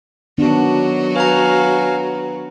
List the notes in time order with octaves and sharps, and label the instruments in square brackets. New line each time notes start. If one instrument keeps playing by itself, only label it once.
[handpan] D#3 B3 D4 [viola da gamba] F#3 F#4
[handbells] B4 A#5 [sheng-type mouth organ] F5 G#5